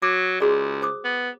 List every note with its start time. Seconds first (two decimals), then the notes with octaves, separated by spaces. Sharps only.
0.02 F#3 D6
0.40 C#2 F#4 G#4 D5
0.82 C5 D6 D#6
1.05 B3